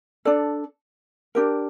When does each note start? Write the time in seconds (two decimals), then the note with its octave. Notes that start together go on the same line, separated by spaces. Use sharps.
0.25 D4 A4 D5
1.35 D4 G4 A#4